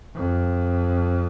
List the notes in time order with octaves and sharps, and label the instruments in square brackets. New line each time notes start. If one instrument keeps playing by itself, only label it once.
[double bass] F2